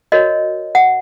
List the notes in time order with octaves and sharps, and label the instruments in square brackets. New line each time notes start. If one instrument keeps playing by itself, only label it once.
[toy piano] F#4 A#4 C#5 D#5
F#5